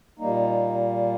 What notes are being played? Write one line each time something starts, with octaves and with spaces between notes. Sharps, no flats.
A#2 G3 A#3 D#4